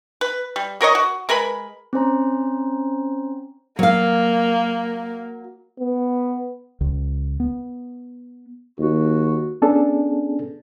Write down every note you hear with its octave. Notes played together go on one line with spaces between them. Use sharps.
B4
G3
F#3 A#4 C#5 D#5
F#4
G#3 A#4 B4 B5
C4 C#4 C5 A#5
F#3 A#3 F5
B3
C#2
B3
D#2 F#4
B3 C#4 D4 G#4 A4